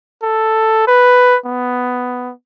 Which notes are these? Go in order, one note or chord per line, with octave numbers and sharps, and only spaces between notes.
A4
B4
B3